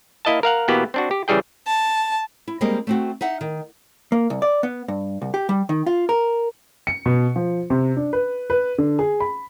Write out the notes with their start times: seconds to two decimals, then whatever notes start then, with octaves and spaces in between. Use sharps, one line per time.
0.25 A#3 E4 D#5 F5 A5
0.43 A#4 F5 F#5
0.68 B2 E3 A#3 B3 G4
0.94 C4 D4 F#4
1.11 G4
1.28 C#3 E3 G3 G#4 G5
1.67 A5
2.48 E4
2.61 G3 G#3 A#3 C4 G#4 D#5
2.87 A3 C4 F#4
3.21 D#4 E5 F#5
3.41 D#3
4.12 A#3
4.30 C2
4.42 D5
4.63 B3
4.88 G2
5.22 C2
5.34 G4
5.49 G3
5.69 D#3
5.86 F4
6.09 A#4
6.87 C#7
7.06 B2
7.36 F3
7.70 C3
7.97 D4
8.13 B4
8.50 B4
8.78 D3
8.99 G#4
9.20 B5